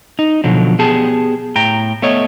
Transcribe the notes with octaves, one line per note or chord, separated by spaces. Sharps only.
D#4
B2 D3 F3 F#3
B3 G4 G#4 A5
A2 G5 A#5
A3 B3 A4 C#5 D#5